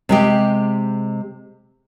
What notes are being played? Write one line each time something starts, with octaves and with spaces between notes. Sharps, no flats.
C3 G#3 G4